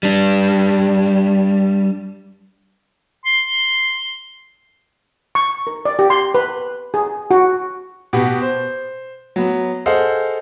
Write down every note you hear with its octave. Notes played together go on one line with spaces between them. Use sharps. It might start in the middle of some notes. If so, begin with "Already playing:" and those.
G3 D4
C6
C#6
A#4
D5
G4
C6
B4
G#4
F#4
B2 B3 F#4 G4
C5
F#3 B3
G#4 A4 C5 D#5 F5 F#5